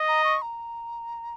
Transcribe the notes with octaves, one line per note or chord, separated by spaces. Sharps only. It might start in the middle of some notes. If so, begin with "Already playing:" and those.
Already playing: D#5
A#5
C#6
A#5